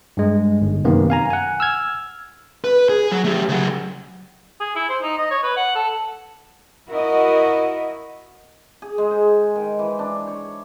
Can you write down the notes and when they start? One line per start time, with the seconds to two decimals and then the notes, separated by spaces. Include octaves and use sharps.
0.17 G2 G#3
0.62 G1
0.85 F#2 C3 D#3 A#3 B3
1.10 F5 G#5 A#5
1.30 F#5 G#5
1.60 E6 F6 G#6
2.64 B4
2.89 G#4
3.11 F#3
3.25 A3 G4
3.49 C#3 F#3
4.60 G#4
4.75 E4
4.89 C5
5.02 D#4
5.18 D#5
5.31 C#5
5.43 B4
5.57 F#5
5.75 A4
6.88 E4 F#4 A#4 D#5
8.82 G#4
8.98 G#3
9.11 C5
9.56 D#3
9.79 E3
9.99 D4
10.27 C#5